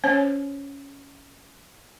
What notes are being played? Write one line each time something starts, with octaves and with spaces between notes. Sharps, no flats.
C#4 C5 C#5